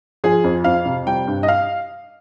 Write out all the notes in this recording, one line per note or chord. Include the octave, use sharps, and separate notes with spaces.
F3 G#4
F2
F2 F5
C3
G3 G5
G2
D#5
F5